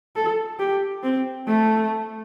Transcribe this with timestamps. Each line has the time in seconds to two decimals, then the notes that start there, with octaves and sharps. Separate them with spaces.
0.16 A4
0.59 G4
1.03 C4
1.47 A3